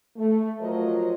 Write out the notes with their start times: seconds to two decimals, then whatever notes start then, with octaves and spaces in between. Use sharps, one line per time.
0.17 A3
0.60 F3 F#3 F4 A#4 C5 D#5